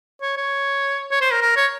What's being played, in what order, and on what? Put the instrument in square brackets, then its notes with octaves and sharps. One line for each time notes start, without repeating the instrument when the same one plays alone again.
[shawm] C#5
C#5
C#5
C5
A#4
A#4
C#5